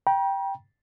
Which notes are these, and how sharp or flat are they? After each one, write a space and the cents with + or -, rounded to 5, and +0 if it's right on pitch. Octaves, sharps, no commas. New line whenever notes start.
G5 +0 A#5 +45